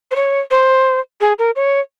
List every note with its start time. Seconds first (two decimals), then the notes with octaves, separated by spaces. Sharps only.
0.11 C5
0.16 C#5
0.51 C5
1.21 G#4
1.39 A#4
1.56 C#5